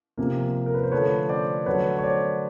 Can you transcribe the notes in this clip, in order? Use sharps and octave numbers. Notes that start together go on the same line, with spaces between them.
C3 F3 A#3
A#4
B4
C5
D3 F3 A3 B4 C#5
C5 D5
D3 F#3 A3 B4 C#5
C#5
C5 D5